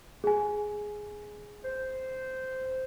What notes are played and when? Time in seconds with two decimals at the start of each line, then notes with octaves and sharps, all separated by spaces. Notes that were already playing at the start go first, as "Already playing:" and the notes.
0.24 G#4 G#5
1.64 C5